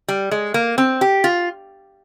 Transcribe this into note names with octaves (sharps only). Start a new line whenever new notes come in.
G3
G#3
A#3
C4
G4
F4